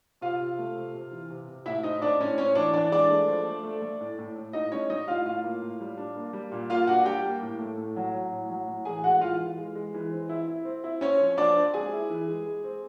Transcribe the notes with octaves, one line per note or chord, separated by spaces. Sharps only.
C3 F4 F5
C3
A3
C3
C3
E3
C3
C3
A2 E4 E5
C4 D#4 D#5
C4 D4 D5
A2 C#4 C#5
C4 C#4 C#5
E3 D4 D5
E3 D4 D5
G#3 D4 D5
A3
F3
A3
A3
A3
A2
A2
A2
A2 D#4 D#5
G3 C#4 C#5
G3 D#4 D#5
A2 F4 F5
A2 F4 F5
A#3
A2
G3
D4
A#3
G3
A#2
A#3 F4 F5
D4 F#4 F#5
G3 G4 G5
A#3
A2
A3
A2
F#3
F#3
A2
F#3
A2
E3 G#4 G#5
G#3 F#4 F#5
E3 F4 F5
E3
G#3
G#3
E3
C4
E4
E4
C4
E4
C4 C#4 C#5
F3
F3 D4 D5
C4
G#3 G#4 G#5
E4
E3
G#3
G#3
C4